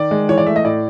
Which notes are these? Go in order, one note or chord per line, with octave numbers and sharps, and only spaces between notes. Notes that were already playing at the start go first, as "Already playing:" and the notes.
Already playing: D#3 D5
G#3
E3 C#5
D5
A3 E5
D#5
A2 D5